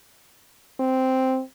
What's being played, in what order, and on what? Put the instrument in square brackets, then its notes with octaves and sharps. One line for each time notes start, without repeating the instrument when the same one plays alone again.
[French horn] C4